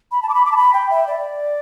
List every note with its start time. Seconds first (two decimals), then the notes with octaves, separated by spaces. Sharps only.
0.12 B5
0.22 A5
0.29 D6
0.34 B5
0.45 D6
0.52 A5
0.57 B5
0.73 G5
0.90 E5
1.07 D5